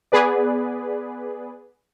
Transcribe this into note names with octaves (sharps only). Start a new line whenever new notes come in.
B3 G#4 B4 D5